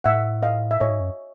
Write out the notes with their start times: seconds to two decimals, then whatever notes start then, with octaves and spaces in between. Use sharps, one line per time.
0.04 A2 E5 F#5
0.43 D#5 F5
0.71 E5
0.80 A2 C#5 D#5
0.90 G#2
1.00 F#2